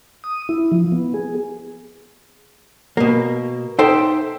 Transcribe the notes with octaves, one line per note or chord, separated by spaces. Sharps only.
D#6
E4
F3
B3
G#4
B2 A#3
D#4 A4 C5 E5 G5